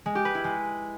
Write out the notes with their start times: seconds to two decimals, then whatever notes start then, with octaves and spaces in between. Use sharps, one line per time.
0.06 G#3
0.15 G4
0.25 B4
0.35 E4
0.44 G#3